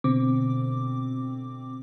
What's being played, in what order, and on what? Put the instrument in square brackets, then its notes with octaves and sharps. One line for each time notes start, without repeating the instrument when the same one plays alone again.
[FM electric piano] B2 D3 C4 D6